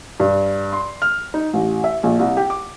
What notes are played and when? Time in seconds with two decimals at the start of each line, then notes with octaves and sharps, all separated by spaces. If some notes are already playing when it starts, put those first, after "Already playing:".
0.20 G2
0.73 C6
1.02 F6
1.34 D#4
1.53 A1
1.84 E5
2.03 A#1
2.19 C2
2.37 G4
2.50 D6